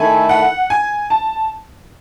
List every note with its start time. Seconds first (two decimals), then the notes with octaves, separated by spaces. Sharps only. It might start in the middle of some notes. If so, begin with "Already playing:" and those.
Already playing: D#3 A3 E4 A4 G#5
0.29 F#5
0.70 G#5
1.10 A5